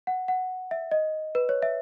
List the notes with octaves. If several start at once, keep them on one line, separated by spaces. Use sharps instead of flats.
F#5
F#5
E5
D#5
B4
C#5
E5